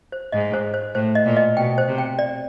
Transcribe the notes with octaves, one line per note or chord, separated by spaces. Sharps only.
C5
G#2 D#5
C5
C5
A2 C5
D#5
A#2
D#5
B2 G5
C5
C3
G5
D5